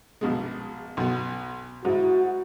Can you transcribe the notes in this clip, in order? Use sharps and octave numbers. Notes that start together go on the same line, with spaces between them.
A#1 B2 G#3
B1 B2
G#2 E4 F#4